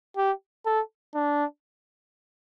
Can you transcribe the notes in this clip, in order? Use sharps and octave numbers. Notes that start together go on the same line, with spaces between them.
G4
A4
D4